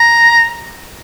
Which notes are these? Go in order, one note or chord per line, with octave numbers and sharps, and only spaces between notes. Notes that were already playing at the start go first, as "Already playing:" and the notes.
Already playing: A#5